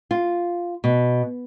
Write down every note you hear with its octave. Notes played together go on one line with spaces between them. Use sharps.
F4
B2